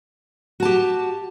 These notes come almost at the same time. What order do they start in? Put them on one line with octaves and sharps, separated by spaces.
F#4 A5 G4